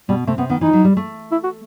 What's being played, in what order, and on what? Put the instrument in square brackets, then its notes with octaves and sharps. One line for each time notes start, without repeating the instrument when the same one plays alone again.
[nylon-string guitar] B2 [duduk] G3
[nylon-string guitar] C3 [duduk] A3
[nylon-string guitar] C3 [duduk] B3
[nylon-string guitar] D#3 [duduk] B3
[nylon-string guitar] E3 [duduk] D#4
[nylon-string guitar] F#3
G3
A3
[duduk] E4
F#4